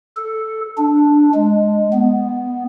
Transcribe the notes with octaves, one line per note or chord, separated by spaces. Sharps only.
A4
D4
G#3
B3